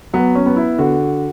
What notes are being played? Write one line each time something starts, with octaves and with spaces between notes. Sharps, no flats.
F#3 B3
C#4
B3
E4
D3 F#4